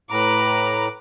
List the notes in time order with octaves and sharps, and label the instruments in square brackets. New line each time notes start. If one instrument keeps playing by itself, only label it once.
[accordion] A2 A#5 [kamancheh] B4 D6